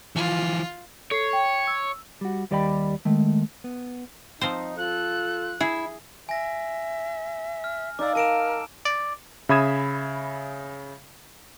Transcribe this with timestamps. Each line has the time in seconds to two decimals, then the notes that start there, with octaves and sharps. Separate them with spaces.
0.16 E3 F3 F4
1.11 A4 C#5 C7
1.33 G5
1.67 E6
2.21 G3 F#4
2.51 D#2 G3 D5 D#5 G5 B5
3.05 D#3 G#3 A3
3.64 B3
4.41 F3 C4 D#4 C5
4.77 F4 A4 F#6
5.60 E4 G#4
6.29 E5 G#5 A#6
7.64 F6
7.99 D#4 D5 F5 D6 E6
8.15 A#4 G#5 A5 D7 E7
8.85 D5
9.49 C#3 E5 B5 D#6 G#6 E7